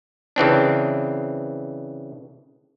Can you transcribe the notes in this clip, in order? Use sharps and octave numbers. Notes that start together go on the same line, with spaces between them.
C#3 E3 C4 D4